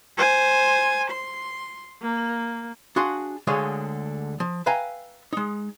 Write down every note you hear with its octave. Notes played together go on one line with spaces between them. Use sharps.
C5 G#5
C6
A#3
D4 F#4 G#4 F5 C6
D2 D3 G#3 G#4 C#5 F5
F3
B4 E5 F5 G5 G#5 A#5
G#3 D#4